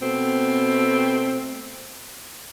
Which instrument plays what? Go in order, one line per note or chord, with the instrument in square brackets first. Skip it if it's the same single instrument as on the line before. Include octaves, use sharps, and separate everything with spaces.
[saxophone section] B2 A3 C4